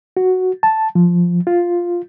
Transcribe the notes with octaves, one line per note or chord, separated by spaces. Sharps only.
F#4
A5
F3
F4